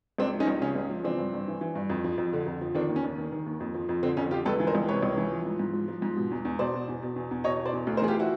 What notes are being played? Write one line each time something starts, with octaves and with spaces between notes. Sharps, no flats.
C#2 C4 D4
F3
C#4 D#4
C#2
C#3 C#4
C#2
F3
E3 C4 D4
G2
G2
E3
E3
G2
F2
F3
F2
D3
F2
F3
D#3 C4 D4
D#2
C#4
D#2
D#3
D#3
D#2
F2
F3
F2
D3 C4
F2 C#4
F3 F4 G4
C#2 A4 B4
E3
A#4 C5
C#2
C3 B4 C#5
C#2
E3
F3
G#2
G#2
F3
F3
G#2
B2
E2
E2
B2 C5 D5
B2
E2
B2
E2
E2
B2 C#5 D#5
B2
C5 D5
E2
D2
A#4 C5
E3 G#4
F4 G4
E4 F#4